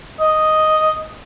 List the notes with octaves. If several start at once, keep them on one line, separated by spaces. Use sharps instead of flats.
D#5